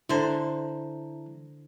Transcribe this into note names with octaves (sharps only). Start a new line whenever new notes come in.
D3 E4 C5 A5 A#5